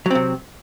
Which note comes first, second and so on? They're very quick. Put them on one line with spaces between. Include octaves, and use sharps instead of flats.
F#3 C4 C3